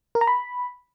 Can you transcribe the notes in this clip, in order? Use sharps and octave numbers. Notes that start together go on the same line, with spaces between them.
A#4
A#5
B5